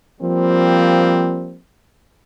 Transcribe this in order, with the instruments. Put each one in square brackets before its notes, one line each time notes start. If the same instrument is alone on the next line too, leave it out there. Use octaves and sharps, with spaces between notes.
[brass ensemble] F3 G3 A#3 C4